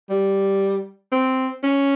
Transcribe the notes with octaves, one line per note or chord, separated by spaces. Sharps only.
G3
C4
C#4